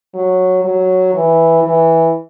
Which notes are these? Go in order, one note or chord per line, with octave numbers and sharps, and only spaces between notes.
F#3
F#3
E3
E3